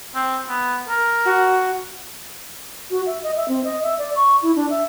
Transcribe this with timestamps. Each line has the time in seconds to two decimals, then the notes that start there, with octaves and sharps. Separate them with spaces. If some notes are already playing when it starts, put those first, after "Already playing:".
0.15 C4
0.49 B3
0.89 A#4
1.25 F#4
2.91 F#4
3.06 E5
3.23 D#5
3.37 E5
3.48 C4
3.64 D#5
3.83 E5
3.98 D5
4.16 C#6
4.43 E4
4.56 D4
4.70 E5